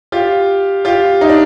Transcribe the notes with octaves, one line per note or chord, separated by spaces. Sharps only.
F4 G4
F4 G4
D#4
D4